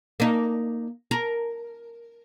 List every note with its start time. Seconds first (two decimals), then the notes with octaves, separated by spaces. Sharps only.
0.20 A#3 D#4
1.11 A#4